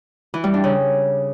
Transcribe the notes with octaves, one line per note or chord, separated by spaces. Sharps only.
E3
G3
D4
C#3